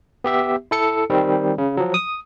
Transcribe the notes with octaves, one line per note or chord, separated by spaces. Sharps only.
B3 G4 E5
E4 A4 C#7
D#3 G3 C4
C#3
F3 F#3
D#6